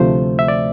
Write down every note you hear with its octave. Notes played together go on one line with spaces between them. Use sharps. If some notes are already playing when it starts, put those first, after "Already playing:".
Already playing: D2 C3 F3 A3 C5
E5
D5